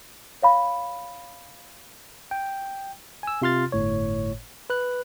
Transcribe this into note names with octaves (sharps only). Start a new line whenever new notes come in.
C#5 F5 B5
G5
G#5 E6
C3 F4 C6 F6 A6
G1 A2 C#5
B4 F#6